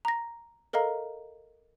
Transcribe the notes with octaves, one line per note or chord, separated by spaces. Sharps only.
A#5 A#6
A4 A#4 D#5 F5 A#5